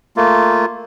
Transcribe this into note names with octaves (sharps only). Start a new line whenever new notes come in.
A3 A#3 F4